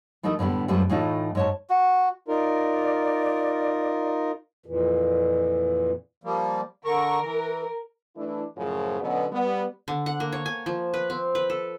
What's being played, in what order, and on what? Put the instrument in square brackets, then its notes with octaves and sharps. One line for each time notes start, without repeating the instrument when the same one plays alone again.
[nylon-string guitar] E3 A3 D#4 E4 A4 A#4
A2 D3 G3 B3
F#2 F3 G3 A3 B4 G5
A2 E3 A3 D#4 F4 A4
G#2 C#5 A5
[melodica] F#4
[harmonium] D#4 F4 A#4 [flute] D5
[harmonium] F2 A#2 E3
[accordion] F3 G3 A#3
[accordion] D3 C#6 [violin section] A#4
[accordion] E3
[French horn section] E3 A3 D4 E4
F#2 A2 C#3 F3
B2 D3 F#3 B3 C#4
G3 B3
[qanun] D3
F#5
A#3
C#5
G#5
F3
B4
C4
B4
A4